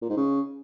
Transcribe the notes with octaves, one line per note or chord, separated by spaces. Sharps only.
A#2
G#2
C#3